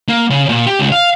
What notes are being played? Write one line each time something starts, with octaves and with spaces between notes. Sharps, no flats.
A#3
C#3
A#2
G4
C#2
F5